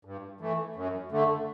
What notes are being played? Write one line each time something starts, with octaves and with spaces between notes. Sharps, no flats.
G2
E3 A3
F#2
D3 A3